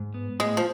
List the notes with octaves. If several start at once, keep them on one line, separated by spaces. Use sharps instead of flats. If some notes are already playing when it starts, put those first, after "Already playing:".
Already playing: G#2
B3
A2 G#3
F3